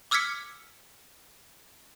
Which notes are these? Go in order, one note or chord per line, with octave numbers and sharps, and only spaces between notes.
D6 E6 F6 G#6 B6 C#7